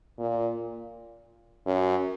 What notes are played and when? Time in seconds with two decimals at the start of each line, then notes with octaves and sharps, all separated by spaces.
0.18 A#2
1.66 F#2